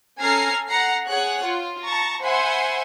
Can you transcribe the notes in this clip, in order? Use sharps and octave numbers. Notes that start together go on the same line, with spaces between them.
C#4 A4 G#5 A#5 F6 C7
F#5 A#5 C7
G#4 C#5 F#5 F#6
F4
A5 A#5 C#6 A6
C5 E5 F#5 G#5 B5 C6